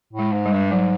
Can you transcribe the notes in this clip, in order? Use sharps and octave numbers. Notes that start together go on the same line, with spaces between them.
A2
G#3
G#2
G3
G2
G#2 F#3